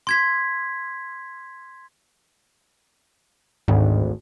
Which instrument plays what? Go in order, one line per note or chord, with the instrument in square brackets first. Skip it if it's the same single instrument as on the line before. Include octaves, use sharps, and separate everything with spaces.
[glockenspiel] C6 G#6 B6
[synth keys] G#1 D2 [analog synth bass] G#2